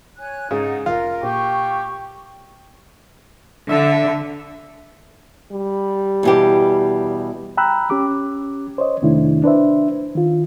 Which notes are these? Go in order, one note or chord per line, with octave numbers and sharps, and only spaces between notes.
C#5 G#5 F#6
G#2 C#3 D#4 D5 F#5
F1 F4 A#4
A#2 G4 C#6
D3 E5
G3
E2 B2 G4
G5 A#5 B5 E6 F#6
C#4 G4 D6
C5 C#5 D#5
F2 C3 D#3 A3 D4 E4
D4 B4 C5 E5
D#3 F4